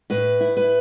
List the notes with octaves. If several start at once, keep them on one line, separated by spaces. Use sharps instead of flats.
A2 B4
E4
B4